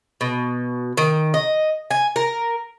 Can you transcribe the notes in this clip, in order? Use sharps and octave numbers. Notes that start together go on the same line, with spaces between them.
B2
D#3
D#5
G#5
A#4